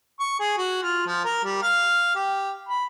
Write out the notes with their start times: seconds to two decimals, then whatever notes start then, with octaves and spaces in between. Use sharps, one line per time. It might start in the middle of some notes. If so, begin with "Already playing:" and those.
0.20 C#6
0.39 G#4
0.57 F#4
0.82 F4
1.06 F3
1.24 A#4
1.44 G3
1.62 F5
2.15 G4
2.68 B5